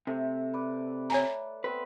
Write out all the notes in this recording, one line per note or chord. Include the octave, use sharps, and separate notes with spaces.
C3 A3
B4 D5
C#5 G#5 A#5
B3 C4 B4